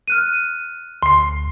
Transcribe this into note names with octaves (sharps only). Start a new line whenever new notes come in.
F6 F#6 D#7
D2 C6 C7